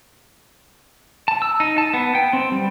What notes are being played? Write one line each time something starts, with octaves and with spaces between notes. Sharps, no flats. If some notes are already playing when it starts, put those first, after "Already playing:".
A5
E6
D#4
A5
B3
G5
C4
G3